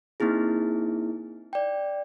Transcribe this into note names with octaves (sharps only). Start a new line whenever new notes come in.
A#3 C4 D#4 E4 G#4
D5 G5